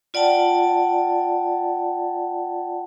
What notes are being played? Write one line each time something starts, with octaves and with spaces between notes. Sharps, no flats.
F4 D5 F#5 G5 A5